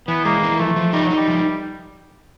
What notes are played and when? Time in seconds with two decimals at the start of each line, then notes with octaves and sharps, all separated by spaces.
0.08 E3 B3
0.25 G#3 A#3
0.43 E3
0.59 F3 A3
0.76 F3
0.93 G3 D#4
1.04 F#3
1.10 D#4
1.16 G3
1.28 F3